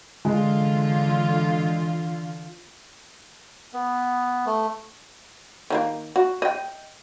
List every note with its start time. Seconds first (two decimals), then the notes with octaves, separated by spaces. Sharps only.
0.25 D3 E3 G#3 F4
3.73 B3
4.46 A3
5.70 D#3 F#3 A#3
6.16 F#4
6.42 D#5 G5